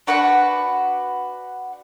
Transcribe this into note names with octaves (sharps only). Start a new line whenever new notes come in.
D4 F#4 B4 F#5